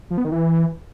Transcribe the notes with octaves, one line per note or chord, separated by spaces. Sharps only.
F3
B3
D#3
E3